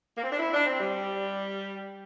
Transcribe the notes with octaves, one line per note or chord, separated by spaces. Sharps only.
A#3
C4
D4
E4
D4
C4
G3